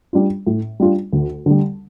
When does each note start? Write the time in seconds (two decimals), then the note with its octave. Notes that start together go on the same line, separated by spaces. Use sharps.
0.13 G3 D4 F4
0.46 A2
0.80 G3 D4 F4
1.13 D2
1.46 D3 G3